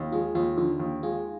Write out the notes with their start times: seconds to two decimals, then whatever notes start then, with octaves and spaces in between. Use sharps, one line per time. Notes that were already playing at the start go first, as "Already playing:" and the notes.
Already playing: D#2 D#4 F4
0.12 G#3 F4
0.35 D#2 F4
0.57 D3 F4
0.80 D#2
1.03 G#3 F4